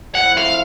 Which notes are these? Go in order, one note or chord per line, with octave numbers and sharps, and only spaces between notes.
F3 A3 C4 E4 F#5
F5